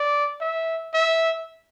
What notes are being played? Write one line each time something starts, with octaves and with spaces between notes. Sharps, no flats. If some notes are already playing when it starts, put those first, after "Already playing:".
Already playing: D5
E5
E5